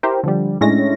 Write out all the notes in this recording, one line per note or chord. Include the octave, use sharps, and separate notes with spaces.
E4 G4 A#4 C5
D3 F3 G3
A2 G#3 C#4 D4 E4 A#6